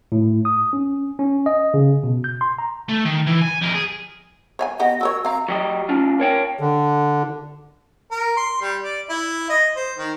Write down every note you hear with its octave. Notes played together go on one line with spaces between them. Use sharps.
A2
D#6
C#4
C#4
D#5
C#3
B2
G6
C6
A#5
A3
D#3
E3
G#5
F2 A#4
G#4
C#5 F5 G#5
B3 G4 D#5 F#5
F#4 A#4 C#5 E6
C4 F5 A#5
F#3 G4 D#5
C#4 D4 F4
A#4 C#5 G5
D3
A#4
C6
G3
D5
E4
D#5
C5
D#3